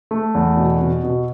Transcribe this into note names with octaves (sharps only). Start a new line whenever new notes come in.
A3
E2
B2
B2
B2